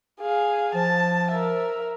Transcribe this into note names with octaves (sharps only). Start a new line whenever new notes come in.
G#4 F5
F3 A5
A#4 E5